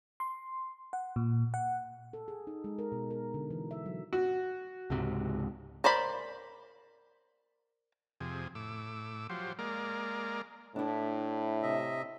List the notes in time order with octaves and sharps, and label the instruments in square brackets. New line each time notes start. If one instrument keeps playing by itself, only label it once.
[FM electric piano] C6
F#5
A#2
F#5
[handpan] A4
G#4
D#4
G#3
A#4
B2
A#4
D3
E3
E5
F#3
[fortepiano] F#4
[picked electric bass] C#2 G#2 C3
[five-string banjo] A#4 C5 D5 B5
[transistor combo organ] F2 C3 G#4
A2 D6 E6
F3 F#3 G4 C5
G#3 A#3 A#4 D5
[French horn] A2 [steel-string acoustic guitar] D4 E4
[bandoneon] C3 D#5 E5